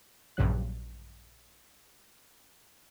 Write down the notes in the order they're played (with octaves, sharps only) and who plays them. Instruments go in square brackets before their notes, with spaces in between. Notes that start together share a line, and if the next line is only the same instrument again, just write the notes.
[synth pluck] A#1 G2 C#3 F#3 F#6